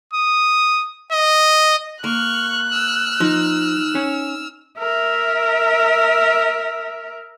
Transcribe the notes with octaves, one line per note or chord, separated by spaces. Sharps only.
D#6
D#5
A#3 C#6 F6 F#6
E6 F6
F3 D#4
C#4
A#4 E5